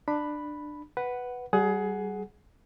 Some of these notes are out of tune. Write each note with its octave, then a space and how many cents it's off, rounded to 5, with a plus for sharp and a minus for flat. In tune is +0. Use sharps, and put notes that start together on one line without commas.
D4 +20 B5 +0
B4 +0 F#5 +5
G3 -25 G#4 +20 F#5 +0